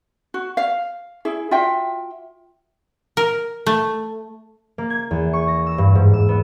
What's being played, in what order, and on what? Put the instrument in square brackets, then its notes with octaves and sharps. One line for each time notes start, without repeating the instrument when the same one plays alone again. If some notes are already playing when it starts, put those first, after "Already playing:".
[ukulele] F#4
F5
E4 G#4
F4 F#4 E5 G5
[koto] A#4
A3
[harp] A#3
G#6
E2
C#6
A#6
E6
G2
G#2
E6
B3